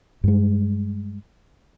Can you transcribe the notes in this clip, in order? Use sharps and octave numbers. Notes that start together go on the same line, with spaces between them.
G2 G#3